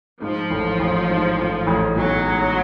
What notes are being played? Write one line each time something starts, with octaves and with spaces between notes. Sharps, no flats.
G#2 F3
A1
A1
G#2
A1
A1
B1 F#3
G#3